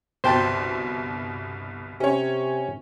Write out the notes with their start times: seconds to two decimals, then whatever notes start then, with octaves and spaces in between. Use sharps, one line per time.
0.24 G1 C2 B2 C5 G5 A5
2.00 C3 C#4 C#5